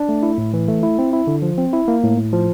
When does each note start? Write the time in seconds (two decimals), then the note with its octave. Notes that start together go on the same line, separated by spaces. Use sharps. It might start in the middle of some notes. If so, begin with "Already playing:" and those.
Already playing: D4
0.09 A3
0.23 E4
0.38 A2
0.54 E3
0.68 A3
0.83 E4
0.99 C4
1.13 E4
1.27 D3
1.42 F3
1.58 C4
1.73 E4
1.88 A#3
2.03 A2
2.17 A2
2.32 F3